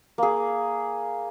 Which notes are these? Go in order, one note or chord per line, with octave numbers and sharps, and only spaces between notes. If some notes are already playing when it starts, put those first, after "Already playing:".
A#3 G#4